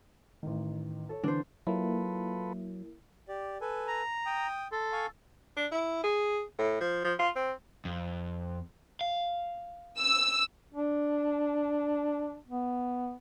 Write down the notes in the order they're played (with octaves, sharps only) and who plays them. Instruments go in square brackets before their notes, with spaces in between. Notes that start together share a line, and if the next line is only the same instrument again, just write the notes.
[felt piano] A1 D#3
A4 C#5
[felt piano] D3 E3 B4 [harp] D4 C5
[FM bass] F#3 [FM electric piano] A#3 E4 [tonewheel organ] F4 A4 B4
[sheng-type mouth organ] G4 D5
A4 B4 G#5
[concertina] A#5
[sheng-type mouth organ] G5 D#6
[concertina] A4 [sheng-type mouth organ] C6
[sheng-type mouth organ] F5 G#5 C#6
[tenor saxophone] D4
E4
G#4
A2
F3
F3
F4
C4
[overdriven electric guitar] F2
F5
[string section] E6
[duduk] D4
B3